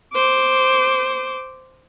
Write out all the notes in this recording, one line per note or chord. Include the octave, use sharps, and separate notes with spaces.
C5 D6